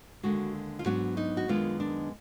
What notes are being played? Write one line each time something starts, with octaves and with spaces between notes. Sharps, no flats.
D#2 D3 G#3 F#4
F4
G#2 F#3 B3 D4 F#4
D#4
F#4
F#2 D#3 G#3 B3 D4 F4
D4